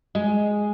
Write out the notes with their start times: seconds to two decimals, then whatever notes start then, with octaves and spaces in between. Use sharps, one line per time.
0.15 G#3